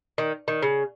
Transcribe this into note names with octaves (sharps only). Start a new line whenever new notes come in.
D#3
D#3
C#3